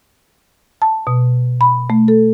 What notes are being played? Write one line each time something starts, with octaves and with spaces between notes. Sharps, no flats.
A5
B2
B5
A3
A4